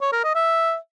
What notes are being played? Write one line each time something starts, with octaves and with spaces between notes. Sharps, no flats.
C#5
A#4
D#5
E5